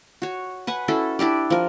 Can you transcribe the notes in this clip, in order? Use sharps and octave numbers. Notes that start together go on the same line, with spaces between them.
F#4 C#5
B4 F#5 G#5
C#4 E4 F#4 A4
D4 E4 G4 D5
F3 A#4